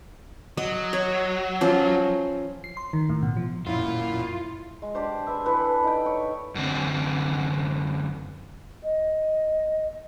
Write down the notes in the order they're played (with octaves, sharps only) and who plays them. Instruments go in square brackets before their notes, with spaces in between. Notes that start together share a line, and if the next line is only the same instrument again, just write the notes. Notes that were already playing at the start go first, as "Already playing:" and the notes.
[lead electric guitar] F#3 [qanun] D#5
[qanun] C#5
F3 C#4
[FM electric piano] C7
C6
D#3
A2
B2
F3
[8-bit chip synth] F#2 A#2 [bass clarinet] E4 [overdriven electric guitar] F4
[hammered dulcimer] G#3
D4 G4 C5
G#4 B4 E5
E3 E4 A4 B4
D#4 G5
C#5
[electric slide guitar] F#2 D3 C4
[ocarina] D#5